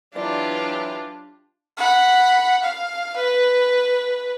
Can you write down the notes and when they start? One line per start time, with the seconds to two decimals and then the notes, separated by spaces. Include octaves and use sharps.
0.16 E3 F#3 D4 F4 G4 D5
1.77 F#5 B5
2.63 F5
3.17 B4